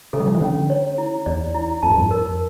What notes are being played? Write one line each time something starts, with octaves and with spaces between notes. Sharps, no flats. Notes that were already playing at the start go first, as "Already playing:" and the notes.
C#3 A4
G3
F3
E3
D3 C#4
C#5
E4
E2 D5
E4
F2 A5
G2
F2
A#4